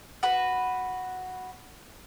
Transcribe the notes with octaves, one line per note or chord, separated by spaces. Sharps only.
F#4 B4